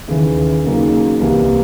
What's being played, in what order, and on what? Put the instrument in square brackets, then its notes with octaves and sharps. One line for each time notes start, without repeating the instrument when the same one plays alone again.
[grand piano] D#2 C#3 E3
C#3 F#3 A#3 D#4 F#4
C2 C3 E3 G3 A#3